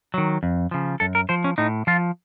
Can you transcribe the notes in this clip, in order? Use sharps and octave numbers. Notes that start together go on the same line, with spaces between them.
D#3 F#3
F2
C#3 F3
F#2 A4
A#4
F3 C5
C#4
A2 D#4
F3 F4